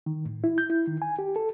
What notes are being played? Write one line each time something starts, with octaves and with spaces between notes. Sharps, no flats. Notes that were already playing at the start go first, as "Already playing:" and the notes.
D#3
A2
E4
G6
E4
D#3
G#5
G4
A4